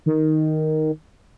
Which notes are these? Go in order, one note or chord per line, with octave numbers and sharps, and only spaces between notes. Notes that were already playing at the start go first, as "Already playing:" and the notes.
D#3